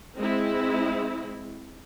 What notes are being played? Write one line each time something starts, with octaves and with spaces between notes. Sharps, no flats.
G#3 C4 E4